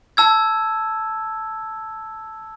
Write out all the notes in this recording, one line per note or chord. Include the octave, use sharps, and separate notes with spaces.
A5 E6 G#6